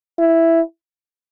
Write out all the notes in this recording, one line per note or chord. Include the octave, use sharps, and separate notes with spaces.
E4